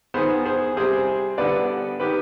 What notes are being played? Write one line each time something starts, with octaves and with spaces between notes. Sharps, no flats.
D#3 B3 G#4 C5
G#4 C5
C3 G3 C4 G#4 C5
D3 G3 B3 B4 D5
D#3 B3 G4 B4